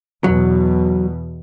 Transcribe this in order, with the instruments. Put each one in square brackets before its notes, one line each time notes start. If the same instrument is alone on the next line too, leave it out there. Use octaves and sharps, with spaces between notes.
[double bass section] E2 B2 [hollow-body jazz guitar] F#3